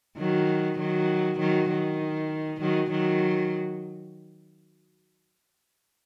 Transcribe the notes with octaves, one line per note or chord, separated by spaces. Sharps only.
D#3 F#3
D#3 F#3
D#3 F#3
D#3
D#3 F#3
D#3 F#3